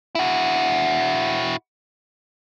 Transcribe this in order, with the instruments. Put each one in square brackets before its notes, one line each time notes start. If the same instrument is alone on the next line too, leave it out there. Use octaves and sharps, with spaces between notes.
[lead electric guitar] E4 F#4